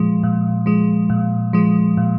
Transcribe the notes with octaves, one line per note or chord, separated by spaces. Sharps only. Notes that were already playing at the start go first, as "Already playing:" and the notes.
Already playing: A#2 F3 G#3
A#2
F3 G#3
A#2
F3 G#3
A#2